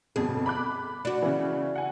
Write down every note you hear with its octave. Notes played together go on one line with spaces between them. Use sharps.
G1 F2 B2 G#4
B5 D6 F#6
D4 F#4
C#3 E3
F#5 G#5